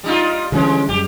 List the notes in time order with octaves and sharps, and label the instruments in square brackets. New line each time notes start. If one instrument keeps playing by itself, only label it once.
[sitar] G3 D#4 F4
[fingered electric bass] D3 G3 C#4 [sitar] E3 G#3
[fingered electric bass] F#2 G3 [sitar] G4